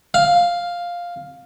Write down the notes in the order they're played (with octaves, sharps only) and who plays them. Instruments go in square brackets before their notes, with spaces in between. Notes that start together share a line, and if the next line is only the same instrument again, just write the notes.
[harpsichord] F5